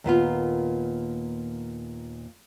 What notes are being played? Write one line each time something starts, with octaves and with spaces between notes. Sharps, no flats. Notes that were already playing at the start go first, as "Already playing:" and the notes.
D#2 A#2 B3 F4